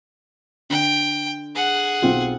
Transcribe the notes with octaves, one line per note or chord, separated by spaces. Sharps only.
D3 G5
G#4 F#5
B1 C4 F4